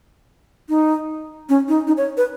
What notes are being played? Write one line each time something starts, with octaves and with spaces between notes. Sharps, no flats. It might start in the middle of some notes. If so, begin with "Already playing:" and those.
D#4
C#4
D#4
D#4
C#5
B4